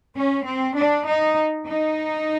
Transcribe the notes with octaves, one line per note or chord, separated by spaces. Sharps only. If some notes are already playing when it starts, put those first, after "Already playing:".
C#4
C4
D4
D#4
D#4